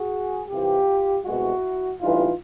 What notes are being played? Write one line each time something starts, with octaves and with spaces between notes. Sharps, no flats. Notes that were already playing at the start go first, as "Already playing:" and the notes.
Already playing: F#4 G#4
C2 C3 E3 F4 G4
C2 B2 G#3 E4 F#4
A1 G2 E3 D#4 F4